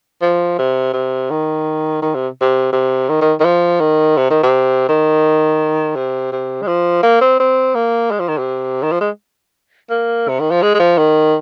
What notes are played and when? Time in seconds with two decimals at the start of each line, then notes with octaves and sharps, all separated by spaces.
0.22 F3
0.59 C3
0.94 C3
1.31 D#3
2.02 D#3
2.15 C3
2.41 C3
2.73 C3
3.09 D#3
3.21 D#3
3.40 D#3
3.45 F3
3.80 D#3
4.17 C3
4.30 D#3
4.43 C3
4.89 D#3
5.95 C3
6.33 C3
6.62 G#3
6.67 F3
7.03 A#3
7.21 C4
7.40 C4
7.75 A#3
8.11 G#3
8.20 F3
8.29 D#3
8.38 C3
8.83 D#3
8.92 F3
9.01 G#3
9.90 A#3
10.29 C3
10.40 D#3
10.51 F3
10.62 G#3
10.75 G#3
10.79 F3
10.98 D#3